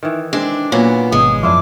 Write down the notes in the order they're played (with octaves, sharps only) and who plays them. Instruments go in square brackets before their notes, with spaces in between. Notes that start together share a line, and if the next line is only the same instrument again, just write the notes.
[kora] D#3 E3
[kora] G#3 C4 [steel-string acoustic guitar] D4
[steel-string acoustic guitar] A#2 B3 [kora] F#3 C#4
[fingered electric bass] G#1 B2 [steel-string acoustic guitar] G#3 [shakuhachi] D#6
[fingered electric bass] F#2 F3 [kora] D4 E4 F4 [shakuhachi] D6